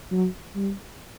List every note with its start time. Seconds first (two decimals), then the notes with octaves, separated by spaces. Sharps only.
0.12 F#3
0.56 G3